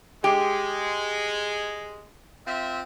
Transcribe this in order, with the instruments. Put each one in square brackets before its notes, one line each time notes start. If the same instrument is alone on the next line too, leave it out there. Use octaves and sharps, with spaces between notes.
[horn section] G#3 [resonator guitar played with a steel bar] G4
[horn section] C4 F4 E5